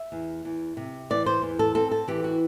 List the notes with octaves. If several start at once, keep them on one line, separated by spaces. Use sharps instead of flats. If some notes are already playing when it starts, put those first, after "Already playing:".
Already playing: E5
E2
E2
C3
E3 D5
C5
E2
A4
C4 A4
A4
E3 G4
F#4